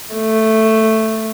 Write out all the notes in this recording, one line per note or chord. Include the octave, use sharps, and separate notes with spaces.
A3